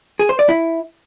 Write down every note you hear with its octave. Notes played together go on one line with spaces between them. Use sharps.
G#4
C5
D5
E4